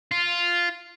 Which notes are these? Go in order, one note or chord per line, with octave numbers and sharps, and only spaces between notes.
F4